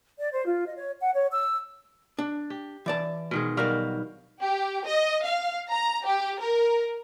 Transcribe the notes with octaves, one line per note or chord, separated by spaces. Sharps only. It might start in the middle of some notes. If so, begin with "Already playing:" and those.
D5
C5
F4
D#5
C#5
F#5
C#5
E6
D4
G4
E3 D5 A5
B2 D#3 G#3
B1 G3 F#4 A#4 D5 F5
G4
D#5
F5
A#5
G4
A#4